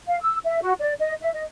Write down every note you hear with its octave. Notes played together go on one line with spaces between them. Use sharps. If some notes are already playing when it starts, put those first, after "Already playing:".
F5
E6
E5
F#4
D5
D#5
E5
D#5